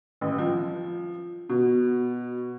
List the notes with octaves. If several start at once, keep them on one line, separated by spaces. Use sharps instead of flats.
A1
F3
B2